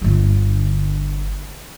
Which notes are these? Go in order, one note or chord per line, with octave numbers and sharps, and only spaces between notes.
G1 D3